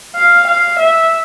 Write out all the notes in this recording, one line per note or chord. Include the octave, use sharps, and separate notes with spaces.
F5
F5
E5